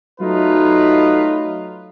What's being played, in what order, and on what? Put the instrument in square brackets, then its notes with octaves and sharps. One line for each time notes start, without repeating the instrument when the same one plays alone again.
[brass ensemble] F#3 A3 D#4 F4 B4